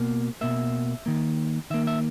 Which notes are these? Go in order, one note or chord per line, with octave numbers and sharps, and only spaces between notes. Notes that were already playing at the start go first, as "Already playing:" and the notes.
Already playing: B2 A#3
B2 A#3 E5
D#3 A#3
D#3 A#3 E5
E5